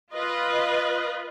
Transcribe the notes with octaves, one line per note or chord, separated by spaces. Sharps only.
F4 B4 D#5